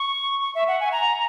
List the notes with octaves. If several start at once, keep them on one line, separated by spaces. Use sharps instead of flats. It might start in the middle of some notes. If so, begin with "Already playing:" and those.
Already playing: C#6
C#6
E5
F#5
G#5
A#5